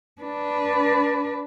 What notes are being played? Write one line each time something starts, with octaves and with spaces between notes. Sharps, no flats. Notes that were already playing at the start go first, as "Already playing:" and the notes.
D4 B4